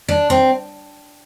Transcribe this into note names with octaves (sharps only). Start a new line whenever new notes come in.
D4
C4